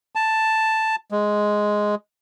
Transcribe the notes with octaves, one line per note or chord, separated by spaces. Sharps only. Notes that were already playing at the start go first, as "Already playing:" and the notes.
A5
G#3